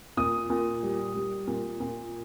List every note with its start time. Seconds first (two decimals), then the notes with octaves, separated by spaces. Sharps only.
0.17 A#2 D#6
0.50 A#2
0.83 G3
1.15 G3
1.47 A#2
1.80 A#2